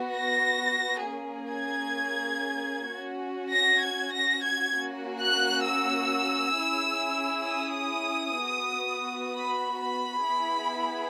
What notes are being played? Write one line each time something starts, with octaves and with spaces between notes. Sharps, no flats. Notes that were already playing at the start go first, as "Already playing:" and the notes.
Already playing: B3 F#4
A#6
A#3 C#4 G#4
G#6
C#4 F#4
A#6
G#6
A#6
G#6
A#3 C#4 F#4
F#6
E6
C#4 E4 G#4
D#6
B3 F#4
B5
B5
B3 E4 G#4